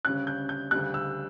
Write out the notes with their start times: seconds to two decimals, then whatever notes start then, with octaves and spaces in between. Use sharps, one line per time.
0.05 D2 C#3 G3 C#4 F#6
0.27 G6
0.49 G6
0.71 D2 C#3 G3 F#6
0.94 E6